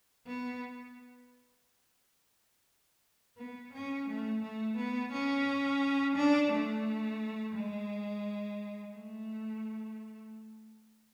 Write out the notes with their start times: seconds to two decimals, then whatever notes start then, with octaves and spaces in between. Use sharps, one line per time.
0.26 B3
3.38 B3
3.73 C#4
4.08 A3
4.42 A3
4.77 B3
5.12 C#4
6.16 D4
6.52 A3
7.55 G#3
8.94 A3